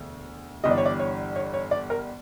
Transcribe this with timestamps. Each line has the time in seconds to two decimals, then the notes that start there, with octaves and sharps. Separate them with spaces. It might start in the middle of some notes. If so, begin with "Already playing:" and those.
Already playing: E1 D2
0.63 G1 G2 E3 G3 D#5
0.71 D5
0.78 C#5
0.86 D5
0.99 C#5
1.36 C#5
1.54 C#5
1.71 D5
1.90 A#4